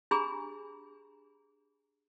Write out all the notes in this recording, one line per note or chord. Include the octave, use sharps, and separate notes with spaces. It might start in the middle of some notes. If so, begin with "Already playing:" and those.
D4 G4 G#4 G#5 A#5 B5